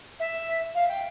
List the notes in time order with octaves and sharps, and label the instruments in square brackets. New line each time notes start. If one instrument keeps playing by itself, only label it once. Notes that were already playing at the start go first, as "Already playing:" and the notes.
[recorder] E5
F5
G5